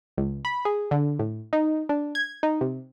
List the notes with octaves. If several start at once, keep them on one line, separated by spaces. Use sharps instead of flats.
C#2
B5
G#4
D3
A2
D#4
D4
G#6
D#4
C3